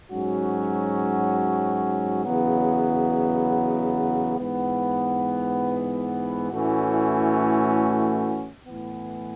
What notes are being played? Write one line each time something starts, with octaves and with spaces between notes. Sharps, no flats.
G#2 F#3 C#4 F#4
E2 C#3 F#3 B3
G#2 E3 B3
A2 E3 A3 C#4 F#4
A2 E3 B3